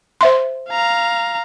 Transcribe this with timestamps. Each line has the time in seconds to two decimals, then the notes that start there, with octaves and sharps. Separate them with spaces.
0.21 C5 E5 C6
0.69 F5 A#5